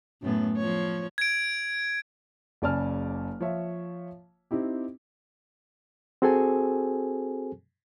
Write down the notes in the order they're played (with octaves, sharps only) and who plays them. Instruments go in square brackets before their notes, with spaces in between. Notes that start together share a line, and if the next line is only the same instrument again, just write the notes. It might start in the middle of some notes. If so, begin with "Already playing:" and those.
[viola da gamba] F#2 A2 B3
F3 C#5
[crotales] G#6 D7
[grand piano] F#1 C#3 D5 G#5 A5 F6
F3 F4 C#5 E5 F5
C4 D#4 E4 G4
[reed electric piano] C4 F#4 G#4 A4 C5 G#5